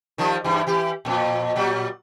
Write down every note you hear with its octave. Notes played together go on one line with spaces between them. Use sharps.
D#3 F3 G3
G2 E3
E3 G4
F2 A#2
A#2 F#3 G3